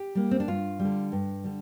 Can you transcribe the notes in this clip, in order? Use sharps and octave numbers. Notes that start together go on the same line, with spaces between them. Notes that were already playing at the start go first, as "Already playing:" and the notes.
Already playing: G4
G3 A#3
C4
D4
G2 F4
G3
D3
G2
D3 G3